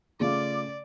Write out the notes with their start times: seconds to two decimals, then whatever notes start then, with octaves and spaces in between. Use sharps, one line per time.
0.20 C#3 A3 F4 D5 D6